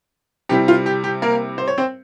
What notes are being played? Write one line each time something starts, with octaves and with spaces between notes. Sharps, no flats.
C3 G3 C4 E4 G4
F4
G4
G4
A#3 A#4
C5
C#5
C4 C5